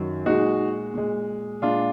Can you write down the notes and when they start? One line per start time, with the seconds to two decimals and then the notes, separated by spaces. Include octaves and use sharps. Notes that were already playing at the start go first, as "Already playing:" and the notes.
Already playing: F#2 D#3 F#3
0.26 A#2 G#3 D#4 F#4
0.94 A#2 G#3
1.62 A#2 G#3 D4 F4